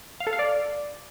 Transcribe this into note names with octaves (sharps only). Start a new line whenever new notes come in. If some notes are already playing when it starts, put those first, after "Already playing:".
F5
A4
F5
D5